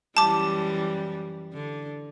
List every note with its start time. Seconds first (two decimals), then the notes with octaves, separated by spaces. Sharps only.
0.17 F#2 E3 G3 A5 D6
1.53 D3